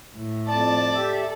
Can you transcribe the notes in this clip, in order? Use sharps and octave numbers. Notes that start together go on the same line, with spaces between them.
A2
F2 D5 A5
G4 A4 E5